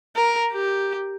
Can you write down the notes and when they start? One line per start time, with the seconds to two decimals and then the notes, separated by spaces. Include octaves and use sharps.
0.16 A#4
0.52 G4